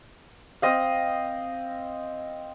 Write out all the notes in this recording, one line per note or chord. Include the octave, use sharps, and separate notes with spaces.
C4 D#5 F5